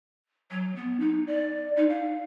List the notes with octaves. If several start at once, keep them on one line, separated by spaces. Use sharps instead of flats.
F#3
B3
D#4
D5
D#4
F5